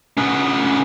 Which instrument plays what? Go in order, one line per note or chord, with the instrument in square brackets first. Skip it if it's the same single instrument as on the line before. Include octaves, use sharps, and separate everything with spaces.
[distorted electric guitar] C#3 B3